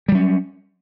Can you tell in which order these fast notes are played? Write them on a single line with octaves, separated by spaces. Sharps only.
G3 F#3 C#4